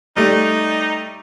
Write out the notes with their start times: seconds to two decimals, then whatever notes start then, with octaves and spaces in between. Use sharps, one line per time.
0.16 G3 A3 D#4 D5